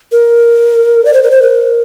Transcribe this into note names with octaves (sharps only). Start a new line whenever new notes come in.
A#4
D5
C5
A#4
C5
A#4